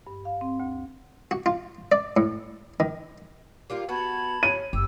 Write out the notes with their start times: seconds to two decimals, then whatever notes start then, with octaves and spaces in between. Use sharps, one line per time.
0.07 G2
0.25 F5
0.41 C4
0.60 D2
1.31 F#4
1.46 F4
1.92 D5
2.17 A2
2.80 D#3
3.70 G3 A#3 F4 F5
3.89 B3 F#4 A5 B5 G#6
4.43 C#4 D#7
4.73 F#1 G4 E6